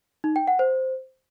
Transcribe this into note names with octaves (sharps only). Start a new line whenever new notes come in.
D#4
G5
F#5
C5